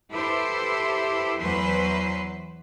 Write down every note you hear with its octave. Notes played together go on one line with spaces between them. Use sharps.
E4 G4 A4 B4 C5
E2 E3 F#3 B4 C5